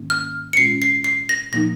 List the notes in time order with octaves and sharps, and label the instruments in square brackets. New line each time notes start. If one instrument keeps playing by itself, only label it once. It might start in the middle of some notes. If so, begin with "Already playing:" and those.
Already playing: [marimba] G#2 D#3 A#3 C#4
[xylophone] F6
C#7
[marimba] A#2 G#3 C#4 F4 [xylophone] C7
[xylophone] C7
C7
A#6
[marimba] A#2 F3 A#3 D#4 [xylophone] A#6